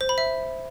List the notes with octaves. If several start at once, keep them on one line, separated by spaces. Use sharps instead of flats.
C5
B5
E5